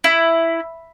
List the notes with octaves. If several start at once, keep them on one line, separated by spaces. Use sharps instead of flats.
E4